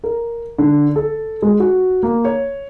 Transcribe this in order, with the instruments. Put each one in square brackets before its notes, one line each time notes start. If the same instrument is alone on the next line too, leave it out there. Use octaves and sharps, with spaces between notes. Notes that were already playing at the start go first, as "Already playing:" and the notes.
[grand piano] A#4
D3
A4
G#3
F#4
A#3
C#5